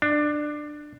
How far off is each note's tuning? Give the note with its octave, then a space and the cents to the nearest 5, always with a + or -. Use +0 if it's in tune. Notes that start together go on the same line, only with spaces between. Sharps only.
D4 +15